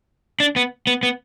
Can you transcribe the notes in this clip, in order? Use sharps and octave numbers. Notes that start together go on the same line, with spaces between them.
D4
B3
B3
B3